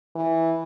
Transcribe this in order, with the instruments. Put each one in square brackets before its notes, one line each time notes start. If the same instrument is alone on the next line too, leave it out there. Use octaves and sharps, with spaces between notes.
[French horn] E3